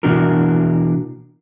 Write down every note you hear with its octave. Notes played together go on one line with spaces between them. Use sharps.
B2 E3 A#3 D4 F#4 A#4